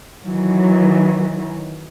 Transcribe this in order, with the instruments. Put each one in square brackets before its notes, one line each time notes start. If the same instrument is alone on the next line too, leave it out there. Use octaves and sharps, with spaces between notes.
[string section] D#3 E3 F#3